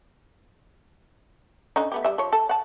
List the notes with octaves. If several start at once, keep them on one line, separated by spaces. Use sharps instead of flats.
D3 C#4 D#4
A3 B3 G4
G3 E5
F3 C#5
A4
F#5 A5